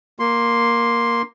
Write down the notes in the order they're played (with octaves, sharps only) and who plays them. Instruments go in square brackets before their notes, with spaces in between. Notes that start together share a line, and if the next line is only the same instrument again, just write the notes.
[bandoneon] A#3 C6